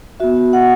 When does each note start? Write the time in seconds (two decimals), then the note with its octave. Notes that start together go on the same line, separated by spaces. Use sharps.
0.20 B3 F#4 E5
0.53 F#5